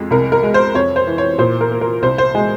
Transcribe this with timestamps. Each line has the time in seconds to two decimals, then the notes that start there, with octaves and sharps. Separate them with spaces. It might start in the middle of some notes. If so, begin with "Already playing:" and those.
Already playing: F2 G#3
0.11 C2 A#4
0.32 A#4
0.43 G#3
0.54 C5
0.74 F2 C#5
0.96 C5
1.07 E3
1.18 C#5
1.39 A#2 C5
1.61 A#4
1.71 A#3
1.81 A#4
2.02 C2 C5
2.18 C5
2.35 G#3 G#4